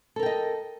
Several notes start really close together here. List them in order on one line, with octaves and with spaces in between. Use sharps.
A4 A#4 G5 D#5